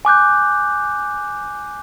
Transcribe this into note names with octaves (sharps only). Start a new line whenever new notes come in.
G#5 D6 F#6 G6